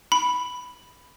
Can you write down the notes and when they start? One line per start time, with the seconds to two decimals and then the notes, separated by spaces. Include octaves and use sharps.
0.12 B5